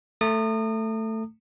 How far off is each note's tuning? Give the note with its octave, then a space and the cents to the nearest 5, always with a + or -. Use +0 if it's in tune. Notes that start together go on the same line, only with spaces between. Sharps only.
A3 +10 A#5 -40 D#6 -35